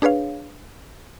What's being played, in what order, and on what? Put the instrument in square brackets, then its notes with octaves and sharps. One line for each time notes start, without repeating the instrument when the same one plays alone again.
[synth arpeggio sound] D4 G#4 B4 C#5 F5